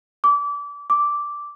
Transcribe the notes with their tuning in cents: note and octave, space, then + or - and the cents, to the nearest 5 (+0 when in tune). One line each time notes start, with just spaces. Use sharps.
D6 -25
D6 -5